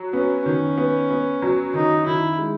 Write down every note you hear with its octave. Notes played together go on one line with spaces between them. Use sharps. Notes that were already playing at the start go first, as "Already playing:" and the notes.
Already playing: F#3
B3 C#4
D#3 C#4
B3
B3
F#3
D#3 D#4
D#3 E4
G#3